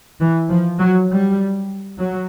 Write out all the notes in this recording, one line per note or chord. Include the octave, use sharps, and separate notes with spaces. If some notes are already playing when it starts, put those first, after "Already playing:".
E3
F3
F#3
G3
F#3